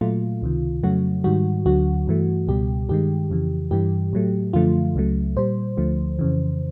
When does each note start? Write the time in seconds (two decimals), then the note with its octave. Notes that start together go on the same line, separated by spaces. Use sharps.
0.01 A#2 F#3 A3 F4
0.42 C#2 C3 D#3
0.83 F2 C#3 F#3 A3 F#4
1.24 G#2 D#3 G3 F#4
1.66 D2 D3 F#3 F#4
2.07 G2 E3 A3
2.47 C#2 B2 G3 G4
2.89 G2 D#3 G#3 G4
3.30 F2 C#3 E3
3.71 G2 E3 G3 G4
4.13 A2 F#3 A3
4.53 F#2 D3 F3 A3 F4
4.95 C#2 C#3 F#3 A3
5.36 A#2 G3 C5
5.77 D2 D3 F3 A3
6.19 F2 C#3 E3